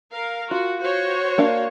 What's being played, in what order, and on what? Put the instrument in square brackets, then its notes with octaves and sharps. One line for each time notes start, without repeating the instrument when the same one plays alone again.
[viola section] A#4 F5
[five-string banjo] F4 [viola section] F#4
[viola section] F#4 C5 C#5
[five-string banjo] A#3 D4 F5